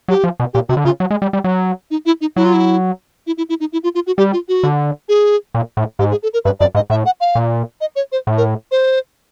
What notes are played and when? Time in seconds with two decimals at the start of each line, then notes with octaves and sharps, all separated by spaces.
0.08 F#3 G4
0.24 F3
0.40 B2
0.53 A#2 G4
0.69 C3 F#4
0.77 D3
0.85 C#3 F4
1.00 F#3
1.10 G#3
1.22 G3
1.33 G3
1.44 F#3
1.91 D#4
2.06 E4
2.21 D#4
2.36 F#3 E4
2.45 F4
2.54 E4
3.27 E4
3.37 E4
3.49 E4
3.60 D#4
3.73 E4
3.83 F4
3.95 F4
4.07 F#4
4.17 G3 G4
4.33 F4
4.48 F#4
4.63 D3
5.09 G#4
5.55 A#2
5.77 A2
5.99 G#2 G4
6.11 G#4
6.23 A4
6.33 A#4
6.45 G2 B4
6.60 F#2 D5
6.75 G#2 D#5
6.90 A2 E5
7.06 F#5
7.20 F5
7.35 A#2
7.81 D#5
7.96 C#5
8.12 C5
8.27 A2
8.37 A#4
8.71 C5